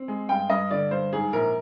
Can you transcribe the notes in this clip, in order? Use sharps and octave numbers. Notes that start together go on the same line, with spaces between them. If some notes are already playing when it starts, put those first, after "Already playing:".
Already playing: C4
G#3
G2 G5
G2 D#5
D3 D5
G2 C5
G#2 G#4
A#1 A#4